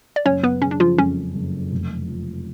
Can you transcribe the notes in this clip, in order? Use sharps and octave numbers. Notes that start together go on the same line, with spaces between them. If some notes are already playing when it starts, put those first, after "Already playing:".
D5
F#1 C#4 C#5
B3 B4
C#3 C#4
D4
F3 F4
F2 C#4
F#1
F1
F3